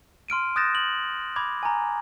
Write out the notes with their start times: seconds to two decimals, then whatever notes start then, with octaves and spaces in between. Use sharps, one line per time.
0.28 C6 F6 D7 D#7
0.56 D#6 F#6 G6 A6 A#6 E7
0.75 F#7
1.36 B5 D6 G#6
1.63 G#5 A#5